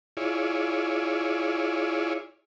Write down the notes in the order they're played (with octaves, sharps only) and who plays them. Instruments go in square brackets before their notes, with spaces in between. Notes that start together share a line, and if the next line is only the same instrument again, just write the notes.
[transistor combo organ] E4 F4 G#4 C#5 D5